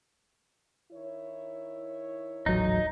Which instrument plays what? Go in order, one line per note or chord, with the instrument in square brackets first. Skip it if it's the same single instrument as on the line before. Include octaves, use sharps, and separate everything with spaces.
[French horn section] D#3 E4 C#5
[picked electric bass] D#1 A1 F#3 [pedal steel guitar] D#4